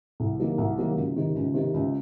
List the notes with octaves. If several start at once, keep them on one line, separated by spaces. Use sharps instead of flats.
C2
C3 D#3 F#3 A#3
C2
C3 D#3 F#3 A#3
C#2
C3 D#3
C#2
C3 D#3
C#2